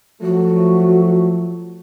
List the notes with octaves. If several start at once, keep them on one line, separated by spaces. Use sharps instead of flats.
F3 F#3 A3 F#4